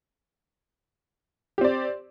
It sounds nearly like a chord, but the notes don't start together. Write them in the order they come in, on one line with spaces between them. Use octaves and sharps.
G4 C4 D5